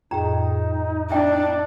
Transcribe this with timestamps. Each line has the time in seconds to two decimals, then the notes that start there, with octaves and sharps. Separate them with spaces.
0.11 F2 A2 D#4 G#4 G5 A#5
1.11 D4 E5 G5